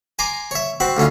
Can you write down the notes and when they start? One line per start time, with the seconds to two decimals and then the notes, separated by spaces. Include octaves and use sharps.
0.19 G#5 A#5 C6 D6
0.51 C#5 E5
0.80 C4 F#4 B5
0.97 D2 D3 C#4 F4